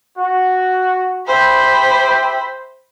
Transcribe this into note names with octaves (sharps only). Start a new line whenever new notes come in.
F#4
G4 C5 E5 G5 B5